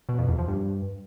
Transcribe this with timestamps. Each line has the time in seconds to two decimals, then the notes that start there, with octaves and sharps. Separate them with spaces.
0.09 B2
0.19 F2
0.29 E2
0.38 F3
0.48 G2